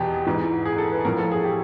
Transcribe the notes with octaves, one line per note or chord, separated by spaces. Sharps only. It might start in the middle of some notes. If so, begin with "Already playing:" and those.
Already playing: E2 B2 G4
G#2 E3
G#4
A4
B4
A2 F3 A#4
A4
G#4
G4